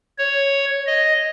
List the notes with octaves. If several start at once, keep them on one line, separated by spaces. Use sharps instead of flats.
C#5
D#5